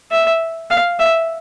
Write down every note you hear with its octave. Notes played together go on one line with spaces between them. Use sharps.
E5
F5
E5